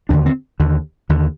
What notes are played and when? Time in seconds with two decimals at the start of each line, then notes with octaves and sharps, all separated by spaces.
0.09 D#2 D3 D4
0.26 C4
0.60 D#2 D3
1.09 D#2 D3